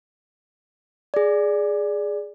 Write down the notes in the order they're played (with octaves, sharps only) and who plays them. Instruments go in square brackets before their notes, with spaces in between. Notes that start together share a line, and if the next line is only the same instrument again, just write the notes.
[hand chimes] G#4 D5